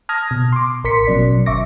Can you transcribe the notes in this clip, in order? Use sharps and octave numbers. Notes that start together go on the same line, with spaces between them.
A5 D#6 F6 G#6 A#6
B2
C6 D6
A1 A#4 C6 B6 C#7
B2 F#3 C#4 D5
G#1 E5 C#6 D6 A#6